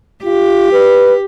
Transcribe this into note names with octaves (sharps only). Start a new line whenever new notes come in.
F4 G4
B4